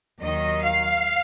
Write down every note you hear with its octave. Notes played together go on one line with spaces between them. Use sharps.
D#2 D#3 F#3 D#5
F5